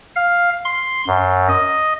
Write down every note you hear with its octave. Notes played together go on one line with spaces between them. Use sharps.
F5
C6
F#2
D#5